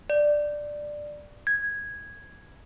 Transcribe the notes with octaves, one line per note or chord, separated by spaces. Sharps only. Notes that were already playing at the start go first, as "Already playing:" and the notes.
D5
G#6